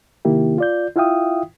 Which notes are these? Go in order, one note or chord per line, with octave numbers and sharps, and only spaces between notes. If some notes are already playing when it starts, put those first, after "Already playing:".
C3 D#3 A#3 E4 G4
F4 D5 G6
E4 F4 E5 F5 G5 D#6